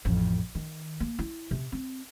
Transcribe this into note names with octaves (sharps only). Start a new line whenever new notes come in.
A1 F2
D#3
A#3
E4
C3
C4